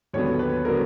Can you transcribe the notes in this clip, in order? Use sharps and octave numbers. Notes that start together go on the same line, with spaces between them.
D#2 D3 F#3 B3 C#5
B4
D3 F#3 B3 A#4